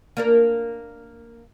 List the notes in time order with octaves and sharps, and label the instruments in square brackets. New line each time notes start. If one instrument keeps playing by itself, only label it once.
[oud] A#3 D4 A#4